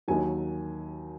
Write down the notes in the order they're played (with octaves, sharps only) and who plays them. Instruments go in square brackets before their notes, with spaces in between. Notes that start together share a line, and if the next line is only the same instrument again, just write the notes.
[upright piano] D#2 D#3 F#3 G#5